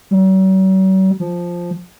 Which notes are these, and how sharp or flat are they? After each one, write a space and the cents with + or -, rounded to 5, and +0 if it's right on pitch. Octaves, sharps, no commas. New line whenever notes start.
F#3 +45
F3 +0